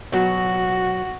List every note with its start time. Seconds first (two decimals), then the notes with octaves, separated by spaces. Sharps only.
0.12 B2 F#3 F#4